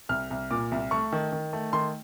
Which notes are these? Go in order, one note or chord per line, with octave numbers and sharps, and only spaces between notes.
C2 F6
C2
A#2 D6
C2
A3 C#6
D#3
D#3
A3
D#3 C6